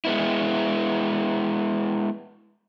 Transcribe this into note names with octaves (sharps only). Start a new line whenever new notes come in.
G#3 B3 E4